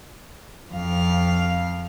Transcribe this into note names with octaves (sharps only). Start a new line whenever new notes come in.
F2 F5